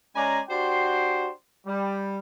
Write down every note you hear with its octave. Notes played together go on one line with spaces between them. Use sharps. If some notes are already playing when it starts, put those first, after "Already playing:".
G#3 C#4 D5 G#5 A#5
D4 F#4 G4 C5 G5 C6
G3